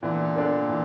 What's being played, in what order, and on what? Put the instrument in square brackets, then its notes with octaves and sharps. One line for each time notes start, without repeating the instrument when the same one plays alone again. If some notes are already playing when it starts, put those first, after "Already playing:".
[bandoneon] A#2 D3 [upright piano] E3
[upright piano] A#3 D4 A4
E3